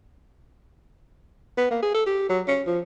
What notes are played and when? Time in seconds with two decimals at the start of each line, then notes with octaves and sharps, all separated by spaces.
1.57 B3
1.71 A#3
1.83 G#4
1.95 A4
2.06 G4
2.30 F#3
2.48 C#4
2.67 F3